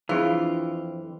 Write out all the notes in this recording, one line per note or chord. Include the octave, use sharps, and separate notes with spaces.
F2 E3 C4 D4 F4 G#4